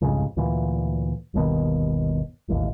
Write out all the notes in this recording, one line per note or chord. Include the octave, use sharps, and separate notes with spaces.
C2 F2 G#2 C#3
D2 A#2 E3
G1 D#2 B2 D#3
E1 A1 D#2